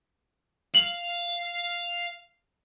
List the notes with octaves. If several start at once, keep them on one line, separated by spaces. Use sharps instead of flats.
F5 F#7